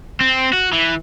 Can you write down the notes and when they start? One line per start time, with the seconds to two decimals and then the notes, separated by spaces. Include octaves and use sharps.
0.21 C4
0.53 F#4
0.73 E3